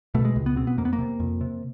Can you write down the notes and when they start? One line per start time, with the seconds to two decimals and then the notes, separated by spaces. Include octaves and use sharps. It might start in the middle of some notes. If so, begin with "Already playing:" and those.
0.15 B2 A3
0.25 G#3
0.36 C#2
0.46 B3
0.56 B2 C4
0.67 B3
0.78 F2 A#3
0.85 B3
0.93 A#3
0.98 C3
1.20 F2
1.41 C3